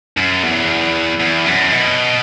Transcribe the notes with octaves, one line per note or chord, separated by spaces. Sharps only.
F#2
E2
E2
F#2
B2